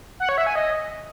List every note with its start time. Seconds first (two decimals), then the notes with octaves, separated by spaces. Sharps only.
0.20 F#5
0.29 C#5
0.38 E5
0.47 G#5
0.55 D#5